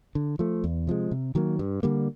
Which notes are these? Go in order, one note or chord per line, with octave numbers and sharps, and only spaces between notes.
D3
F3 A3
E2
C3 F3 G#3
C3
D#3 F#3 A#3
G2
D3 G3 A#3